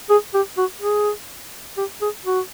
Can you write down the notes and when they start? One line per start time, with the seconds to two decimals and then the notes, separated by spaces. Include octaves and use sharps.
0.10 G#4
0.34 G4
0.57 F#4
0.81 G#4
1.77 G4
2.01 G#4
2.25 F#4